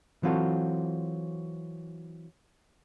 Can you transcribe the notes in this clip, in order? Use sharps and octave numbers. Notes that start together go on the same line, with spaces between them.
E3 F#3 C4 F4 F#4 A4